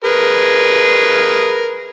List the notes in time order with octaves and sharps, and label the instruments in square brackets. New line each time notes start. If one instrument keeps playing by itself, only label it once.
[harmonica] G#4 A#4 B4